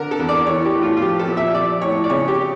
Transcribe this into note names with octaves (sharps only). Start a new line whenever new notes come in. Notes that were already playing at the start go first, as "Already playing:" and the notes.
Already playing: D3 A#4
A4
E2
D5
E3 C#5
G4
A2
F4
F4
F3 G4
A4
A#2
E5
F3 D5
A2 C#5
D5
C#3 C#5
G4